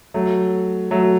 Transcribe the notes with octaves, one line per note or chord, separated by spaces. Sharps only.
F#3 A3
F#3 A3